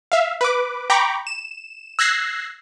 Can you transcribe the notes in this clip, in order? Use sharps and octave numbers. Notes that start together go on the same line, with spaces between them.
E5 F5
B4 D6
G5 A#5 B5 C#6 D6
E7
E6 F#6 G#6 A#6 C7